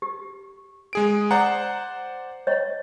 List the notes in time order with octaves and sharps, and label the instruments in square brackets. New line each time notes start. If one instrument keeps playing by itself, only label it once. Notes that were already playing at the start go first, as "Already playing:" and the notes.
[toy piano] G4
[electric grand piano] G#3 G#4 D7
[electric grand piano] C5 D5 F#5 [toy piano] A#5
[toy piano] C#5 D#5